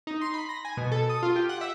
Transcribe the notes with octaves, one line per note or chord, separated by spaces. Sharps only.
D#4
C6
B5
A#6
G#5
B2
A4
D#6
F4
G4
F#5
E5